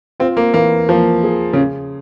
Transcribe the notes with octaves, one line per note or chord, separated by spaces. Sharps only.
C4 F4
A#3
E3 A#3
F3 A#3
G#4
C#3